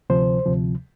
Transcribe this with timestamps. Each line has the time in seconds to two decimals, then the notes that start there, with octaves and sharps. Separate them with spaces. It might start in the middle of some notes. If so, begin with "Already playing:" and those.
0.10 D2 C3 F3 C5
0.46 D2 C3 F3